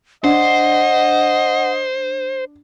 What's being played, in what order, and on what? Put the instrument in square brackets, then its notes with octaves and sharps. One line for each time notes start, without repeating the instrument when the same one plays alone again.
[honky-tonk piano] D4 [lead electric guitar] C5 [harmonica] D#5 [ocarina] F#5